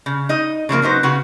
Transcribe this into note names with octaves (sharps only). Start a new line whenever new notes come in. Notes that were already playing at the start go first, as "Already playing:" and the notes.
C#3
D#4 D#5
C#3 F3 A3 A#3
F#3 B3 D#4 C5
C#3 B3 F#4